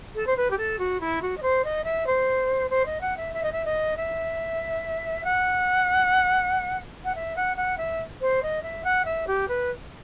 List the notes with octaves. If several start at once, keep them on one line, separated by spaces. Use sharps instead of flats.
A4
C5
B4
G4
A4
F#4
E4
F#4
D#5
C5
D#5
E5
C5
C5
D#5
F#5
E5
E5
D#5
E5
D#5
E5
F#5
F#5
E5
F#5
F#5
E5
C5
D#5
E5
F#5
E5
G4
B4